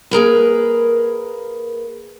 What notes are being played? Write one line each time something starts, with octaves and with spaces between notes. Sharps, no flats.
A#3 G#4 A#4 B4